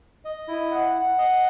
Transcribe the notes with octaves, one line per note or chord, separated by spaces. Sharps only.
D#5
E4
F#5
F#5
D#5